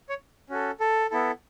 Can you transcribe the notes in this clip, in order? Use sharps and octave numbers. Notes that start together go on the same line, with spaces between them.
C#5
C#4 F#4 A4
A4
B3 E4 A4